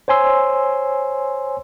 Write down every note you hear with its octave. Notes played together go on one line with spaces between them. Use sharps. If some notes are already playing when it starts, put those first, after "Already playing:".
C5 C#5 G#5 C6 E6